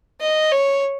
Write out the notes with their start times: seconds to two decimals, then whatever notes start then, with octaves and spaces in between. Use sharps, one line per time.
0.21 D#5
0.51 C#5